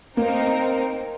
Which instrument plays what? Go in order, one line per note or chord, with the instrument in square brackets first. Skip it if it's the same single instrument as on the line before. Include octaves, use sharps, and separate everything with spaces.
[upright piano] A#3 [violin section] C4 D#4 A#4